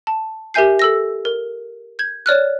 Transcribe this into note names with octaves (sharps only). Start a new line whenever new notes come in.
A5
G4 A#4 E5 G#5 G6 C7
A4 E6 A#6
A#4
G6 G#6
C#5 D5 F6 F#6